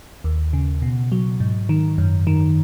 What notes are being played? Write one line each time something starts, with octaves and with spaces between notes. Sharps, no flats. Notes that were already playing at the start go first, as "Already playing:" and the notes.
D#2
C#3
B2
F#3
G#2
D#3
F#2
D#3